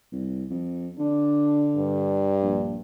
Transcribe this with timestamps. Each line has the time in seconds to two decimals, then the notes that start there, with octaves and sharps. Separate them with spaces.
0.12 C2
0.50 F2
0.99 D3 D4
1.77 G2
2.42 A#1